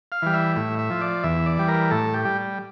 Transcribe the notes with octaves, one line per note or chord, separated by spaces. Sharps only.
F5
E3 G3
E5
A2 E5
E5
F3
D5
E2 E5
D5
E3 G3
A#4
A2 A4
G4
G3